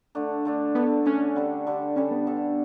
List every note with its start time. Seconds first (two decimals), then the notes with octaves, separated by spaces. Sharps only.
0.15 D3 A3 D4
0.45 D3 A3 D4
0.75 D3 A3 B3 D4
1.05 D3 A3 C#4 D4
1.36 D3 G3 D4 A4
1.66 D3 G3 D4 A4
1.96 D3 G3 C#4 D4 A4
2.11 B3
2.27 D3 G3 D4 A4